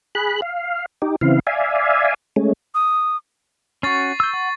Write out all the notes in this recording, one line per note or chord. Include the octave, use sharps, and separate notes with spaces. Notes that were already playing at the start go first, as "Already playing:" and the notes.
G#4 B5 F#6
F5
D#4 G4
C#3 E3 C4 E4 F5
D5 E5 F5 G#5
G#3 A3 C#4
D#6
C#4 F#4 C#6 A6 C7
E6 G6
F#5